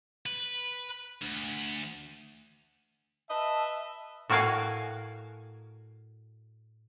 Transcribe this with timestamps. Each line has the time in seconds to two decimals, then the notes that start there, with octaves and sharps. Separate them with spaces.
0.26 B4
1.22 D2
3.30 B4 D#5 E5 A5
4.29 A2 F#4 A#4 C#5 F5 G#5